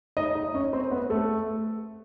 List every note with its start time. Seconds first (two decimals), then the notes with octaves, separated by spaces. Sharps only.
0.17 D#4 D#5
0.35 D#4 D#5
0.54 C#4 C#5
0.73 C4 C5
0.91 B3 B4
1.10 A3 A4